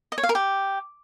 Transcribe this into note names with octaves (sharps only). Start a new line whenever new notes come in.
D#5
C#5
F5
A#4
G4